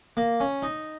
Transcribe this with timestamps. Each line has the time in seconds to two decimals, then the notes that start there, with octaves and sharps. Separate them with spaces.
0.17 A#3
0.40 C#4
0.62 D#4